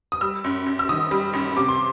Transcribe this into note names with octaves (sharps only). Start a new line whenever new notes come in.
D#6
G3 E6
F#2
F#2
E6
D#3 D#6
G3
F#2
C3 D6
C6